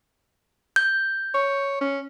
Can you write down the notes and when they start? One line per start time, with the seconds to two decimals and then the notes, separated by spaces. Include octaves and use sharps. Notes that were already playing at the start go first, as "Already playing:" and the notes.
0.76 G6
1.34 C#5
1.81 C#4